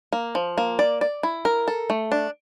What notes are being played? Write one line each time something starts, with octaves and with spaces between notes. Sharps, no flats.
A#3
F3
A#3
D5
D5
E4
A#4
A4
A3
D4